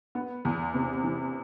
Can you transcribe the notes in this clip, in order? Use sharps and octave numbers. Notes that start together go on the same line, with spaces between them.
B3
E2
C3
E3